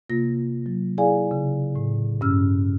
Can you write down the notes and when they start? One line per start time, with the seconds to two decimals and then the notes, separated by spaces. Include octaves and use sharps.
0.10 C3 A#3 F4 A#6
0.66 F#3
0.98 E4 G#4 D5 F5 G#5
1.31 C#3
1.75 A2
2.21 G2 C#4 E6 F6